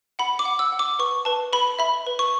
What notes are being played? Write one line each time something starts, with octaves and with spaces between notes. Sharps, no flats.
F#5 B5
D6
F#5
E6
F#5
D6
B4 C#6
B4 A5
B4 B5
E5 B5
B4
C#6